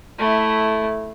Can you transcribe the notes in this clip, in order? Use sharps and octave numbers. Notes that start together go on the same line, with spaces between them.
A3 E4